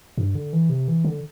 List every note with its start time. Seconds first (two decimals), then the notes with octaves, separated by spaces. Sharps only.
0.17 G2
0.35 D3
0.53 E3
0.70 C3
0.88 E3
1.05 D3